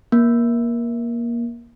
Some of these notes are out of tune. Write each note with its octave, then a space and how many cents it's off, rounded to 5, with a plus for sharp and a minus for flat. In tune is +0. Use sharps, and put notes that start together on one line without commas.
A#3 +20